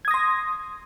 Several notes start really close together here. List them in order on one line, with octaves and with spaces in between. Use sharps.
G#6 D#6 A#6 C6